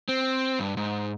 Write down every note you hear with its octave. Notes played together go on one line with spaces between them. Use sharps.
C4
G2
G#2